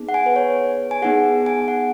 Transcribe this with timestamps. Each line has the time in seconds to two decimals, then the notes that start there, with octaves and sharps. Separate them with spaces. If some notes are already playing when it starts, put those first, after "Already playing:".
Already playing: B3 D#4 G#4
0.09 F#5
0.14 G#5
0.26 B4
0.36 C#5
0.91 G#5
1.02 B3 D#4 G#4 F#5
1.46 G#5
1.68 F#5